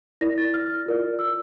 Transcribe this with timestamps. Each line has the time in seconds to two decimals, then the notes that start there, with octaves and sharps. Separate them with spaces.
0.21 E4 A#4 D5 A#6
0.38 A6
0.54 F6
0.86 F4 A#4 D5
1.19 E6